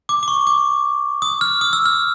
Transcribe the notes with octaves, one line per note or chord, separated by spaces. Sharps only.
D6
D6
C#6
D6
D#6
F6
D#6
E6
F6